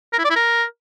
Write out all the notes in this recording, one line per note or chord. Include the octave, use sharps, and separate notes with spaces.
A#4
E4
D5
E4
A#4